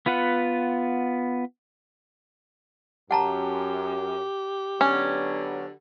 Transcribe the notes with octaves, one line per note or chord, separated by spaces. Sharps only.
B3 F4 B4 F#5
F#2 G4 F#5 A5 A#5
D3 F#3 B3 C#4